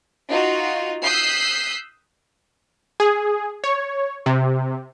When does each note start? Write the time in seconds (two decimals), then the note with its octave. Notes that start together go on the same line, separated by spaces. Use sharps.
0.29 D#4 F4 F#4
1.04 D#6 E6 F#6 G6 B6 C7
3.00 G#4
3.64 C#5
4.26 C3